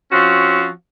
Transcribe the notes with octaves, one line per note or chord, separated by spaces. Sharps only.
F3 C4 C#4 F#4